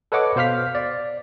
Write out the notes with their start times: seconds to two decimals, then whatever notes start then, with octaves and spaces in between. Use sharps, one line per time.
0.12 A4 B4 C#5 D#5 F#5 D6
0.36 B2 C5 F5 F6 B6
0.75 D5